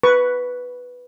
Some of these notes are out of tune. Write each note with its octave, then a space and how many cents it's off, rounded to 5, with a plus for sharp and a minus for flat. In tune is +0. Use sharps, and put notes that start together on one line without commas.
B4 +0 C#6 +15